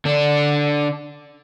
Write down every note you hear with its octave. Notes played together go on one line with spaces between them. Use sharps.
D3 D4